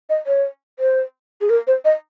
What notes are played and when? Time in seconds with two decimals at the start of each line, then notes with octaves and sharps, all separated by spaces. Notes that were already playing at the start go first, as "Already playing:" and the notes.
0.10 D#5
0.27 C#5
0.79 C5
1.41 G#4
1.50 A#4
1.67 C5
1.85 D#5